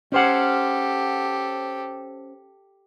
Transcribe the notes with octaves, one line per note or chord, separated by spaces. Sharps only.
C#4 G4 A4 C5 F#5